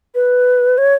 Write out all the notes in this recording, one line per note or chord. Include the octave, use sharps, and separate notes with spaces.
B4
C#5